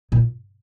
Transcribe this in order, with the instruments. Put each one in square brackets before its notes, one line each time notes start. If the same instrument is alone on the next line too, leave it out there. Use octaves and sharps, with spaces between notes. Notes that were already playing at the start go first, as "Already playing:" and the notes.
[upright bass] A#2